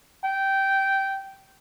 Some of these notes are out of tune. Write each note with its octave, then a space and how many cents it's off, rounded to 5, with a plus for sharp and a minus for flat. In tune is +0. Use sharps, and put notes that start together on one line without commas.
G5 -15